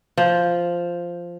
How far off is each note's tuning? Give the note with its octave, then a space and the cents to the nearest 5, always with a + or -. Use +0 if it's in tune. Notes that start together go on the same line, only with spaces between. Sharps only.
F3 -5